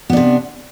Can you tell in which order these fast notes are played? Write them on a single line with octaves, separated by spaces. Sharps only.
B3 D4 C3